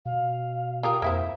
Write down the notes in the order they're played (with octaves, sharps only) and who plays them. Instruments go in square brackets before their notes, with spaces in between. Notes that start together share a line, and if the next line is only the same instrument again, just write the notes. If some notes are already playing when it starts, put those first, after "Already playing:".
[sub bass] B2 [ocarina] F5
[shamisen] F4 G4 A#4 [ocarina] D#6
[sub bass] F2 [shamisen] A#3 E4 C5 [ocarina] E5